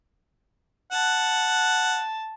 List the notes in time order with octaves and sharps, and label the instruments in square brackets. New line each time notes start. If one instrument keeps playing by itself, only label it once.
[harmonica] F#5 [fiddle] A5